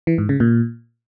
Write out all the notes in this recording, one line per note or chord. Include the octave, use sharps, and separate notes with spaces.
E3
G#2
C#3
A#2